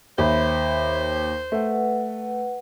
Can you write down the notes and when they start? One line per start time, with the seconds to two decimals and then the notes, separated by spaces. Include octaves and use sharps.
0.18 D#2 C5 E5 B5
1.52 A3 B4 F#5